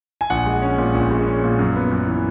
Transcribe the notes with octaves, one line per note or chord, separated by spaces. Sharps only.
G#5
A#1 F#5
G#3
C#4
A#2
A#1
G#3
C#4
A#2
F#2
B3
F#2
E3